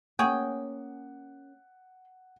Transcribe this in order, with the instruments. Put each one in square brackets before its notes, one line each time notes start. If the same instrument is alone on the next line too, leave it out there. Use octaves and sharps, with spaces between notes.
[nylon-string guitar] A#3 C#4 [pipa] G#4 C#5 G5 [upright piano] F#5